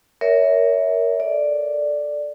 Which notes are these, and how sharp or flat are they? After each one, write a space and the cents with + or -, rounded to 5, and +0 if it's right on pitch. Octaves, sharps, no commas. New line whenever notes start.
A#4 +0 C#5 +20 E5 -20
A4 +0 D5 +0